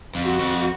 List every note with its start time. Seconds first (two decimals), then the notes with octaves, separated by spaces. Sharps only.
0.15 F2
0.28 F#4
0.39 F2